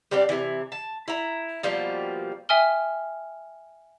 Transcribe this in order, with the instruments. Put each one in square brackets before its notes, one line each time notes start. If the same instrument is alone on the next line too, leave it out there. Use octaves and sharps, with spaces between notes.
[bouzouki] G3 C4 D4 G4
C3 E3
A5
E4 A#5
B2 F3 G3 A#3
[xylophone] E5 G5 G#5 D#6 F6 G7